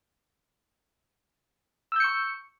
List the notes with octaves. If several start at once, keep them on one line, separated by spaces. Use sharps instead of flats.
C#6 E6 G6 C#7